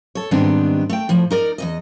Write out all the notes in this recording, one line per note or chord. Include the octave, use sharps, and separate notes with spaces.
A4 C#5
G#2 D#3 G3 B3 C4 D4
A3 G5
A2 F3
D#4 A#4 D5
E2 G#2 D#5